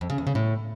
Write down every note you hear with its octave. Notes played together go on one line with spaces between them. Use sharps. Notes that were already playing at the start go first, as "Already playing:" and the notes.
F2
C#3
E2
C#3
A2